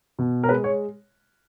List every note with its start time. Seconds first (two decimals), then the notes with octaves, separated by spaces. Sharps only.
0.19 B2
0.44 A#4
0.49 G#3 B4
0.64 C#5